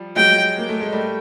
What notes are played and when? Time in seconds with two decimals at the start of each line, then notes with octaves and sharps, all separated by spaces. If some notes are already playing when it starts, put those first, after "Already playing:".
Already playing: F3 G3
0.16 F#3 G#3 G5
0.58 A#3
0.69 A3
0.81 G#3
0.93 G3 A3